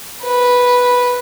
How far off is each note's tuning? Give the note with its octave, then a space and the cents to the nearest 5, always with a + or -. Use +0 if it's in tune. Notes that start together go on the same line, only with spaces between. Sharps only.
B4 -5